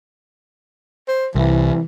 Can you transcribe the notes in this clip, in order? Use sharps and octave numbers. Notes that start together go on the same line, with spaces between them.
C5
C2 E3